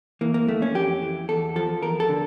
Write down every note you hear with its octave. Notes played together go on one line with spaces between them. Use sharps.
E3 A#3
A#3
F2 A3
C#4
F2 G4
E3
E2 A4
F3 A4
E2 A#4
A4
D3